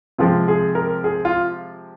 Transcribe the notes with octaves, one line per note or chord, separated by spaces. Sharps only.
C3 F3 G#3 C4 F4
G#4
A#4
G#4
F4